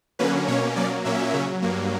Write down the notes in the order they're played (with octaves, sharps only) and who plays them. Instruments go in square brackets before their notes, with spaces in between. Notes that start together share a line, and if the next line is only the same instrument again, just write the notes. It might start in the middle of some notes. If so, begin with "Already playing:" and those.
[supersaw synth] D3 F#3 A#3 C#4 B4
B2 A#3 C#4 C#5
B2 F#3 A#3 C#4 D5
A#2 F#3 A#3 C#4 E5
C#3 F#3 C#4
G2 F#3 A#3